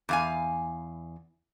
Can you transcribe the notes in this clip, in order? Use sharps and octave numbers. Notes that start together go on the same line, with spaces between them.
E2 F5 G#5